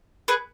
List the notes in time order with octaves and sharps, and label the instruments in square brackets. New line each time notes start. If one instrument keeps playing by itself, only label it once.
[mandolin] G#4 B4